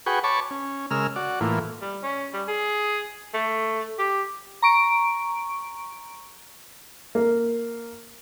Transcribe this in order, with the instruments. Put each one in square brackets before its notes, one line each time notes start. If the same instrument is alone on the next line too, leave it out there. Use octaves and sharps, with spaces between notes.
[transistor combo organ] F#4 G#4 B4 G5 C#6
C#5 A5 B5 C#6 D6
C#4
C#3 G#3 A#4 E6 F6
F#4 D5
A2 E3 A#3 F4
[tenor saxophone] G3
C#4
G3
G#4
A3
G4
[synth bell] A#5 C#6 D7
[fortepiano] A#3